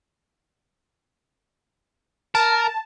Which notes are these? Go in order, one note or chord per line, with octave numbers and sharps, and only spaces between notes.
A#4 A5